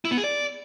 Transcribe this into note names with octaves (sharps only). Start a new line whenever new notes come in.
E4
B3
G#4
D5